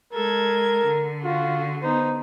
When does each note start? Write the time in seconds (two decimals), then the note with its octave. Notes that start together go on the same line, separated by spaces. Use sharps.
0.13 G#3 A4 A#4 G#6
0.88 D3
1.24 F4 F#4
1.83 B3 D#4 C5